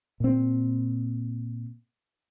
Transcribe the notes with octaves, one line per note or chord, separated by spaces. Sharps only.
A#2 C4